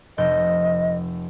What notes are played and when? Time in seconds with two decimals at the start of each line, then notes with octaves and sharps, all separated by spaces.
0.18 F1 D#5 G6